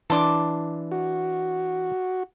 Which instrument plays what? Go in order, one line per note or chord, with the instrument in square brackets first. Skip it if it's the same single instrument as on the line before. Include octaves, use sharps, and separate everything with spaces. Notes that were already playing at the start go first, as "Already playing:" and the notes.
[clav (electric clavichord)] E3 D4 [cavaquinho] A5 C6 D6
[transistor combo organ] F#4